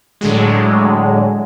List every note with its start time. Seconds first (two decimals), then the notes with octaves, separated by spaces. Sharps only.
0.21 A2 D3 F#3 G#3